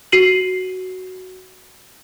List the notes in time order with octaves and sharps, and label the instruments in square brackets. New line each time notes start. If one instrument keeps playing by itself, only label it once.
[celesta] F#4 C7 D#7 F#7